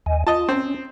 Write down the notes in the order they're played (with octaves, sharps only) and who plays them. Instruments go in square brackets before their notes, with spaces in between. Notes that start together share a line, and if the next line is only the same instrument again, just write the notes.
[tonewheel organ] D#2 D#5 G#5
[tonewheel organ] F4 [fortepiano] D#5 A5
[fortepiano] C4 [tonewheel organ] C#4